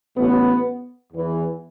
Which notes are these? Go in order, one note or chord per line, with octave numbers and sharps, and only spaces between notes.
A1 A2 F#3 B3
E2 E3